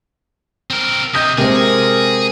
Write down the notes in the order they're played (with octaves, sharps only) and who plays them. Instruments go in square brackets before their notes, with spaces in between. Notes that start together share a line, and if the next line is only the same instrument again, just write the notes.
[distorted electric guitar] C4 A#4
[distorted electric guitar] C3 [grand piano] D#5 G6 A#6 [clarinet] D#6
[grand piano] C3 G#3 C4 [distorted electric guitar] G#4 [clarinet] A#4